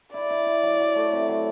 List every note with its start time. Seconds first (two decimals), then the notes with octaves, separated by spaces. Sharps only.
0.14 E4 D5
0.30 E4
0.46 E4
0.63 F#3
0.80 F#3
0.96 A3
1.12 C3
1.28 F#3